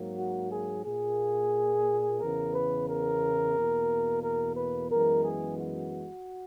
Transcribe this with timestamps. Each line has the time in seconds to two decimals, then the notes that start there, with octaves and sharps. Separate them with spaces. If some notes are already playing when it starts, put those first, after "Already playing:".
Already playing: G#2 F#3 A#3
0.17 F#4
0.51 G#4
0.85 A#2 A#3 G#4
2.20 E2 C#3 E3 B3 A#4
2.54 B4
2.88 A#4
3.55 E2 B2 A#3
4.23 A#4
4.56 B4
4.90 F#2 E3 G#3 B3 A#4
5.24 G#4
5.59 F#4